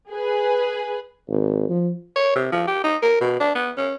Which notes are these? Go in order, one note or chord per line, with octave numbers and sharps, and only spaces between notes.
G#4 B4
G#1
F3
C#5
C3
F3
G4
D#4
A#4
B2
D4
B3
C#4